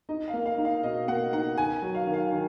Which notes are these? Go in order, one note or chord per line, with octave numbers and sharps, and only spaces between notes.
D#4 D#5
F5
A#3
F5
D#4
F5
B2 D#5
A#3 F#5
D#4 F#5
D#3 G#5
F#3
F5
D#3
F5
D#3